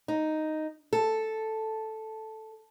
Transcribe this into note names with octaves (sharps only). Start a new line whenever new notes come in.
D#4
A4